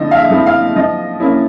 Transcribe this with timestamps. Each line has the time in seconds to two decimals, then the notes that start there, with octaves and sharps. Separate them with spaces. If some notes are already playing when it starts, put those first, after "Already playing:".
Already playing: D3 F3 A3 C4 E4 D#5
0.11 F5
0.16 E5
0.30 F3 A3 C4 E4
0.46 F5
0.76 F3 D#5
1.20 A#3 C#4 E4